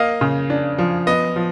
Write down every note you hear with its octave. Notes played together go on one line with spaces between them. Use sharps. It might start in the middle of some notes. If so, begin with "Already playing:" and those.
Already playing: A#3 D#5 F5
C#3
D4
F3
B3 D#5
F3